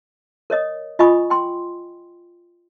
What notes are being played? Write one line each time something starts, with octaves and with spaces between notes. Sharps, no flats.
A#4 C#5 D#5 D#6
F4 D#5 G#5 B5 C#6 D#6
G5 C6